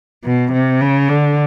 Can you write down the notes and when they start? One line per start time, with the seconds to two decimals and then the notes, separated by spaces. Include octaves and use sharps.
0.24 B2
0.53 C3
0.81 C#3
1.09 D3